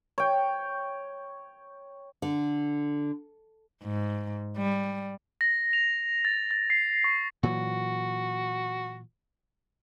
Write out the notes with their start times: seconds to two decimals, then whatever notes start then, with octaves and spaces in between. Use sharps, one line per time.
0.18 C#5 G5
2.22 D3
3.83 G#2
4.57 G3
5.41 A#6
5.73 F7
6.25 A6
6.51 A6
6.70 C7
7.04 C#6
7.43 A#2 E3 F#3 F#4